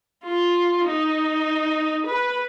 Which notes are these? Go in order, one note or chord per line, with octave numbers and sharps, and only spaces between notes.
F4
D#4
B4